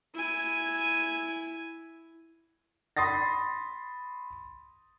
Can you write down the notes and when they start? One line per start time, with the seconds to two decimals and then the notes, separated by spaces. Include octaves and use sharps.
0.15 E4 G#5
2.97 B5 C6 D#6 A6 A#6